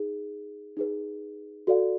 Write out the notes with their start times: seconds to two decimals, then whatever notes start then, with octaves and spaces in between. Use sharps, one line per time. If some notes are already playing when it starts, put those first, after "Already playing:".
Already playing: D#4 G#4
0.77 D#4 G#4 B4
1.67 F#4 A4 D5 F5